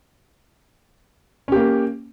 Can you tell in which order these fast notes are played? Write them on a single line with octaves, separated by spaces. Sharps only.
C#4 G4 A#3